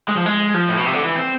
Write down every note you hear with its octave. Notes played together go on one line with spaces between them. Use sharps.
G#3
F3
G#3
F3
A2
B2
C3
D3
E3
C4